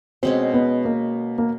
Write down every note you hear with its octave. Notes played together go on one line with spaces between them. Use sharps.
B2 G#3 C4 C#4
B3
A#3
A#3